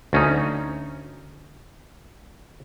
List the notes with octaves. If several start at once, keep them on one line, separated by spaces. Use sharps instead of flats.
D2 C#4 D#4